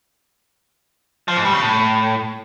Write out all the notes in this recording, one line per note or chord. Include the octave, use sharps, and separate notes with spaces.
F3
G#2
G3
C#3
A2